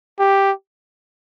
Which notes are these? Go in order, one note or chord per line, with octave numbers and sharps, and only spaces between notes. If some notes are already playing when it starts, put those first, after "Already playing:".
G4